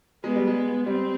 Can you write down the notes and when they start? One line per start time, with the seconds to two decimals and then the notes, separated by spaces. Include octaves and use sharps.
0.24 G#3 B3
0.36 G3
0.47 G#3
0.86 G3 C4